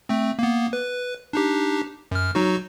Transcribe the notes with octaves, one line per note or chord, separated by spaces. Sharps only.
A3 C4
A#3 B3
B4
D4 D#4 G4
F#2 F6
F#3 D#4 F#4